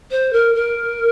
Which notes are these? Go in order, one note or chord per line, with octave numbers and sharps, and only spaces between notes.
C5
A#4
A#4